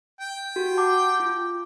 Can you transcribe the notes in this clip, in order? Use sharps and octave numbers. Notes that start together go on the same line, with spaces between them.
G5
F#4 G4
F#5 A5 D6
F4 D6